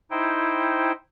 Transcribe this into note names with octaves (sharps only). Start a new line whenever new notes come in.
D#4 E4 C5 G5